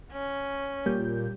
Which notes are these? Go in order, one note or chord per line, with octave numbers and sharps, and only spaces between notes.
C#4
A#2 G3 G4 G6